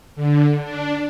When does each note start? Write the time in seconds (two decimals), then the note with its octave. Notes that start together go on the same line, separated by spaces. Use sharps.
0.16 D3
0.62 D4